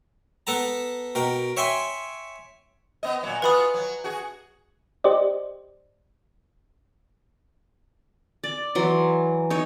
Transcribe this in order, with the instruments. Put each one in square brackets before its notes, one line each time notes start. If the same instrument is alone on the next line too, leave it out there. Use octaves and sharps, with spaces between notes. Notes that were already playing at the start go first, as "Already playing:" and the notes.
[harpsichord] B3 A4 A5 A#5
B2 A#4 G5
C#5 E5 G5 G#5 C6
[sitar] B3 D#5
A#2 F#3
[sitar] B3 F4 F#4 [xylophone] B4 B5 D#6
[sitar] F#3
F#4 G#4
[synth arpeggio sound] G4 C5 D5 D#5
[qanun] D5
E3 F#3 C6
D#4 C#5